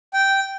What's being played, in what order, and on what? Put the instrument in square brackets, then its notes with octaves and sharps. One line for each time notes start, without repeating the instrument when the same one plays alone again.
[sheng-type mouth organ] G5